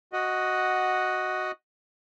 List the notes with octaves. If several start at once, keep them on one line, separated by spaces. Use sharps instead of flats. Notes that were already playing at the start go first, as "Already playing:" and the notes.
F#4 D#5 F#5